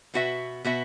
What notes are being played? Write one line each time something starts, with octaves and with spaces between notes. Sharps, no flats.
B2 B3 F#4 B4 E5
B2 B3 F#4 B4 E5